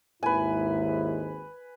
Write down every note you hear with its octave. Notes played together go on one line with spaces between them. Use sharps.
G#1 D#2 G#2 E4 B4 G#5